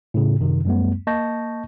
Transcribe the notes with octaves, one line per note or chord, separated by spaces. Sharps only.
A2 C#3
F#2 C3 D#3
F#2 G3 A3 B3
A#3 D#5 A5 C#6 G6 A#6